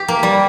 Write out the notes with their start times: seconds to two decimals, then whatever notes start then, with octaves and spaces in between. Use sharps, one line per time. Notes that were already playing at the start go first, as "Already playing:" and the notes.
Already playing: G4
0.08 A#3
0.23 G3